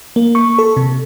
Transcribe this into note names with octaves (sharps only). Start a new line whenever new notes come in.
A#3
C#6
A4
C3